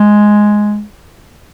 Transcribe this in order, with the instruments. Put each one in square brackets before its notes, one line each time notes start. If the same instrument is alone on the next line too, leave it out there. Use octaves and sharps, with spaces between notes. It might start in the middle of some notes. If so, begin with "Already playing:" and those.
Already playing: [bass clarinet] G#3